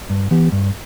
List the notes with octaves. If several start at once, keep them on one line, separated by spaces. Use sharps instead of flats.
G2
E3 B3 G4
G2